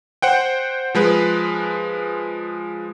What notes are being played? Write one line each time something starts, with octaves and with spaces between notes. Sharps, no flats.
C5 F#5 G5
F3 G#3 B4